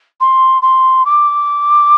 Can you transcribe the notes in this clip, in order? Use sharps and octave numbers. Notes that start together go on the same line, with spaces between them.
C6
C6
D6